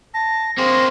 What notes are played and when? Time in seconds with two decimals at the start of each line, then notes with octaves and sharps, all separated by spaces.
0.14 A5 A#6
0.58 A#3 C4 G#4 C6